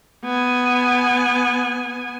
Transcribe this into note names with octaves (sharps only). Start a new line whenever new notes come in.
B3 G#5